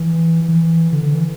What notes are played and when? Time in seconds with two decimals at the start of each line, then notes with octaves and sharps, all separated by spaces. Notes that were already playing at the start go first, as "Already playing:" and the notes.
Already playing: E3
0.48 E3
0.92 D3
1.03 D3
1.14 E3